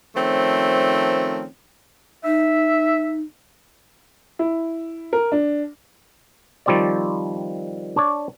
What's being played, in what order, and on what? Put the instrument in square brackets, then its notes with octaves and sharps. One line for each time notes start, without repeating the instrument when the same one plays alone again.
[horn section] D#3 F3 A3 C4 C#4
[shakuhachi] D#4 [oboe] E5
[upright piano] E4
A#4
D4
[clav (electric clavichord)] D#3 F3 G3 C4 C#5 D5
D4 C#5 D5